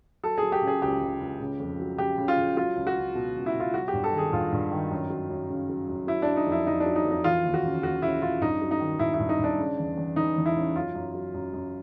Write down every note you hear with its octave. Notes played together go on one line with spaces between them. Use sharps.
F#3 A4
G#4
F#3
G4
C#3
G#4
C#2 G4
C#2
C#2
C#3
F2
F#3
C#3 G4
C#3
F4
C#3
F#3 F4
C#2
F#4
C#2
B2
C#2
E4
B2 F4
F#3 F#4
G4
G2
A4
D#3 G#4
G2 F4
G2
D#3
F#2
F#3
F#2
C#3
F#3
F#2
F#3 E4
F#3 D4
D#4
F2
E4
F2 D#4
D4
F#3
D#4
F2
D#4
E3 F4
D#2
F#4
C#3
D#2 F#4
C#3 E4
C#3 F4
G2 D#4
F#3
D#4
D#3
G2 E4
E4
G2
D#4
G2 D4
C#3
E2
E2
E3 D#4
E2
E4
C#3
F#2 F4
F#2
F#3
F#2
F#2